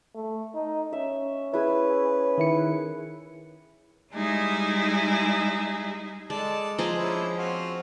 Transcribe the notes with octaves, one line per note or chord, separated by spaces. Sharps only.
A3
D#4
C#4 E5
E4 G#4 B4
D#3 E4 C#7
G3 G#3 D#4 E4 G#4
G#3 A4 D5 A5
F3 G#4 D#5 A#5
C#4 D4 E4
C4 F4 F#4